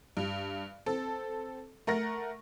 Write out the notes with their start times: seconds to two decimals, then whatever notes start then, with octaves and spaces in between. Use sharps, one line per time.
0.17 G2
0.86 C4 A4
1.87 A3 A#4 F#5 A#6